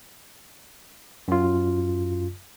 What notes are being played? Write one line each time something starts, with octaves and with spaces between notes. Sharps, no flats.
F#2 F4